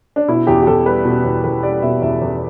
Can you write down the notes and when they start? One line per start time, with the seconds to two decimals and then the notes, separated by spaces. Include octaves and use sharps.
0.16 D4
0.28 B2 E4
0.47 E2 G4
0.62 G4
0.67 E2 A4
0.86 G3 B4
1.05 B2
1.24 E2
1.44 E2 B4
1.63 G3 D5
1.82 B2 E5
2.02 E2 E5
2.22 E2